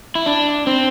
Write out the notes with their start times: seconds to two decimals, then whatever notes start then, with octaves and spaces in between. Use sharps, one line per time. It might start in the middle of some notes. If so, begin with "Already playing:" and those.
0.15 E4
0.26 D4
0.67 C4